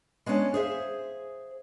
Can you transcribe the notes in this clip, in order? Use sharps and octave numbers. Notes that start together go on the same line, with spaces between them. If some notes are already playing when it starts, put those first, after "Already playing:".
G#3 A#3 B3 C#4 D4
G#4 C5 E5 F5